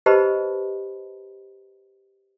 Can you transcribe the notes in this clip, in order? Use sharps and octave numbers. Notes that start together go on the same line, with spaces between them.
G4 B4 C5 D#5 A5 B5